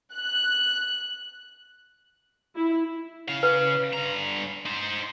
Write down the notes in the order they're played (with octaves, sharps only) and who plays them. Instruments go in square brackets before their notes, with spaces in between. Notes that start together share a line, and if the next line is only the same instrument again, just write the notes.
[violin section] F#6
[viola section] E4
[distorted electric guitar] C#3 F5
[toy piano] B4
[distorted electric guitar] G2 A#5
D#4 C5